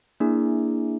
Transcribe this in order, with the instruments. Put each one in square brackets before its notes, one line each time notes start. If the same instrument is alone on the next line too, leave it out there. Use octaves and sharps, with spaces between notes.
[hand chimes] A#3 D4 E4 G#4